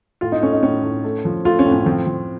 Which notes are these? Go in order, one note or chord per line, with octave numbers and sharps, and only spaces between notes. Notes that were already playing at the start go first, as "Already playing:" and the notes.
A2 F4
D#4
A3 C#4
D#4
A2 C#4
A2
A3
F3
A3 F4
C#4
A2
C#4
F3 C4
F3